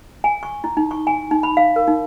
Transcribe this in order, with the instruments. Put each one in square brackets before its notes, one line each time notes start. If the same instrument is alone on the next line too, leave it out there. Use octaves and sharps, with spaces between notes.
[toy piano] G#5
C#6
E4
D#4
C#6
G#5
D#4
B5
F5
A#4
D#4